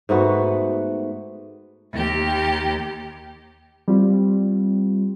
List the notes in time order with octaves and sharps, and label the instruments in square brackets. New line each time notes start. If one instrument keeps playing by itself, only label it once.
[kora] G#2 A3 B3 F#4
[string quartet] D#2 G4
[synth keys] G3 C4 F4